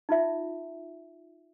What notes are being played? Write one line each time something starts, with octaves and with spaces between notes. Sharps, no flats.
D#4 F4 E5